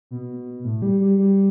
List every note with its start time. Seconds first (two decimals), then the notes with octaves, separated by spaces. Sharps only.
0.11 B2
0.64 A2
0.82 G3
1.00 G3
1.18 G3